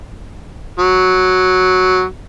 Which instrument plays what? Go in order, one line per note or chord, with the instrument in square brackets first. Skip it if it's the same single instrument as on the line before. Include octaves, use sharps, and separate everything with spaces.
[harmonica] F#3